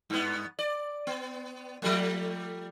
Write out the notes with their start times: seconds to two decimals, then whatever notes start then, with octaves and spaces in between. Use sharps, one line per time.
0.10 G2 B3
0.59 D5
1.07 B3
1.82 F3 G3 A3